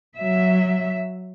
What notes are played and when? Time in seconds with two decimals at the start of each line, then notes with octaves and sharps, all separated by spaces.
0.17 F#3 E5